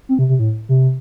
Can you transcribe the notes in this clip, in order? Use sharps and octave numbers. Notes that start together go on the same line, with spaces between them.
C4
C3
C3
A2
C3